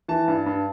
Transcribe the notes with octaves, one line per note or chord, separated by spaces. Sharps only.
E3 A5
G2
G2